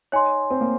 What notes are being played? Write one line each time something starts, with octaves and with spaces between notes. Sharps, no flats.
D#4 C#5 G#5 C6
C4
A#3